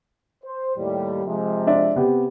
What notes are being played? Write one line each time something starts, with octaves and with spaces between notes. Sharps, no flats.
C5
D#2 A2 G3
C3 F3 G#3
D4 D5 E5
C3 B3 G4